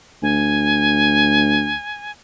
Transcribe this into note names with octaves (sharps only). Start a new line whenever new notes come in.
D2 G#5